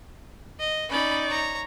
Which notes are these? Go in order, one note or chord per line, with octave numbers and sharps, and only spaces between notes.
D#5
C#4 D#4 D5 B5
C#5 A#5